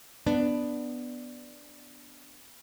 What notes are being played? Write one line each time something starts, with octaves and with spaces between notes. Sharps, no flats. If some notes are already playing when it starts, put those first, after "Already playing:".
B3 D4